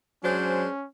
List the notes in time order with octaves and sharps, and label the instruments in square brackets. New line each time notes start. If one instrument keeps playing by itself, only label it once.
[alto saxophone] F#3 [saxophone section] G#3 D4 C5 [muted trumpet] C#4